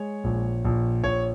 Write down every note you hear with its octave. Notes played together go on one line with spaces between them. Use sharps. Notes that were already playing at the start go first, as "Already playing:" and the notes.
Already playing: G#3 C#5
A#1
A#1
A#1 C#5